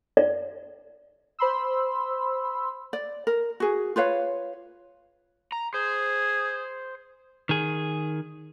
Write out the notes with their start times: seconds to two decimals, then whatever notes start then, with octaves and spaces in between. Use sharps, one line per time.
0.17 D5
1.39 C5 B5 C6 E6
2.93 D5
3.27 A#4
3.60 F#4 G#4
3.96 F4 B4 C#5 F5
5.52 A#5
5.74 G#4 C5
7.49 D#3 G#4